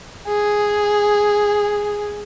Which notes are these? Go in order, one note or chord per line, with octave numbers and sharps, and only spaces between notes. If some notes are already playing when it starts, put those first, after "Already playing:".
G#4